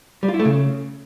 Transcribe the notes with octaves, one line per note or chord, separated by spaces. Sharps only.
G3
F4
E4
A3
C#3